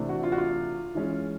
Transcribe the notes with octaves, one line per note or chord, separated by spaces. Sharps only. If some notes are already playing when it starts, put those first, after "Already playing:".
Already playing: C3 E3 A3 D4
F#4
F4
F#4
F4
E3 G#3 C#4